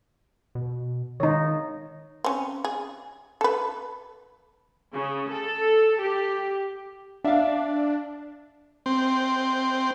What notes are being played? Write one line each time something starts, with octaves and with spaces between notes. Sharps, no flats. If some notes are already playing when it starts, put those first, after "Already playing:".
B2
D#3 D#4 C#5
C4 C#4
G#4
A4 B4
C#3
A4
G4
D4 E5 F5
C4